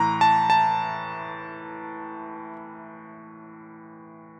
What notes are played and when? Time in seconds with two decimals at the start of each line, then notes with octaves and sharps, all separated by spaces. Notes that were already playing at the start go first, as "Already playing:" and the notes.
Already playing: A2 E3 A#5
0.21 A5
0.50 A5